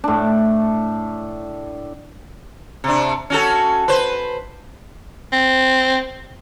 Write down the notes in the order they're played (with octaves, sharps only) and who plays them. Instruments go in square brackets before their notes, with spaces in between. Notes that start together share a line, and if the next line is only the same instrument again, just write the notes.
[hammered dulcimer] A2 D4
[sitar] C3 D4
C#4 F#4 A4
B4 C5
[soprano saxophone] C4